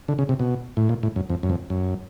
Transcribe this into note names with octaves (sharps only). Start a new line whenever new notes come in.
D3
C#3
C3
B2
A2
A#2
A2
F#2
F2
F#2
F2
F#2